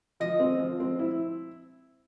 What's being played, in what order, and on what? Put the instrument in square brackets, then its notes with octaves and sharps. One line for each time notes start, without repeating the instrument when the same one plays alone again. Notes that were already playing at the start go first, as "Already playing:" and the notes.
[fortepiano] F3 [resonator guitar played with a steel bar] D#5
[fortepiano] C4
F3
C4
E4